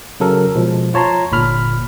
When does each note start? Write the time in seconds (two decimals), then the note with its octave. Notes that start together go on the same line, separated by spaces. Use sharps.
0.20 C#3 F#3 A4 A#4
0.55 B2 F3 G#3
0.94 F4 C#5 A5 A#5 C6
1.32 G1 A#2 B5 F6